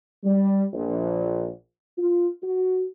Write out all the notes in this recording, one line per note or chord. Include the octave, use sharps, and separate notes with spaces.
G3
A#1
F4
F#4